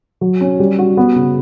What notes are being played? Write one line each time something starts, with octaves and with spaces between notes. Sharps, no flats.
F#3
C#4
G3
F#4
B3
C#3